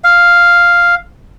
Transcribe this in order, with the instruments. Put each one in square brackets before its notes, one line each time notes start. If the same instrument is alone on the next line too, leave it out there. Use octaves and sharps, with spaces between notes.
[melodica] F5